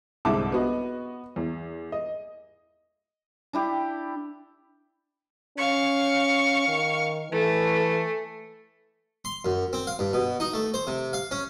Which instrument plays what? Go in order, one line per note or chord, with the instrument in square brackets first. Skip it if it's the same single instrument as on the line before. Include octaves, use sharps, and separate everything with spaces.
[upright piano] C2 G#2 D3 E5 A5 D6
B3 F#4 D#5
E2
D#5
[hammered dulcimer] D4 E4 G4
[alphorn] C#4 [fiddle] F5 C#6
[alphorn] D#3
[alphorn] E3 [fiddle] A3
[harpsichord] C6
F#2
C4
F5
G2
B2
D#4
A3
C5
C3
F5
C#4